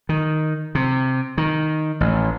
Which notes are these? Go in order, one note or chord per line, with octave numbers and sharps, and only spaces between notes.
D#3
C3
D#3
A1